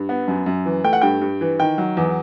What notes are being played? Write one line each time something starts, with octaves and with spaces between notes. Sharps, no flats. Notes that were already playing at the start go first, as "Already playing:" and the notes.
Already playing: G2
B3
F#2
F#2
E3
A3 G5
F#5
G2 G5
G2
E3
D#3 G5
F#3
E2